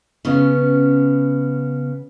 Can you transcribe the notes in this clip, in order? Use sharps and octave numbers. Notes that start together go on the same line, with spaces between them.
C#3 B3 C#4